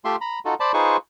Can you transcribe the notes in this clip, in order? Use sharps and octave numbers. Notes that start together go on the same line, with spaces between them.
A3 F4 G4 E5 C6
A#5 B5
D#4 F4 F#4 A4
C5 D5 A5 B5
D#4 F4 G#4 B4 C5 C#6